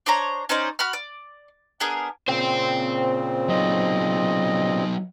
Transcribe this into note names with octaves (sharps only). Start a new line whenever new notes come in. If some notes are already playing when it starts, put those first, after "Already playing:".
D4 C5 C#5 A#5
C#4 D#4 C5 D5
F#4 B5 F6
D5
B3 D4 G#4 A#4
A#2 C#3 C4 C5 G5
F#3 D#4 D#5